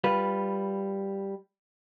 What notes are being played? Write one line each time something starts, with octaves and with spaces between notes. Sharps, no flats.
G3 F4 B4